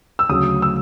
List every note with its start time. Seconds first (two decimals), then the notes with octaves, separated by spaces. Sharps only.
0.19 E6
0.29 D2 C#3 F#3 D#6
0.62 E6